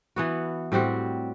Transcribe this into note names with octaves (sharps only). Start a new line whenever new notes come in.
E3 B3 F#4
A2 G3 C4 F#4